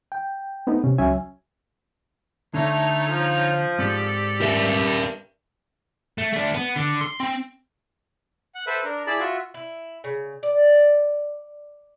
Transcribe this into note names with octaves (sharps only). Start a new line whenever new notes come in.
G5
A3 B3 C4 D#4
C3 C#4
C#2 F#3 C#4 E5 G#5
D3 A3 D#4 C#5 A#5
F3
G#2 C4 G4 A4 D5
G2 A#4 E5
A3
A3 D4
B3
D3
C6
C4
F#5
A4 B4 C5 E5
D4 A#4
E4 G#4 D5 A5 B5
F4 F#4 E5
E4
C#3
D5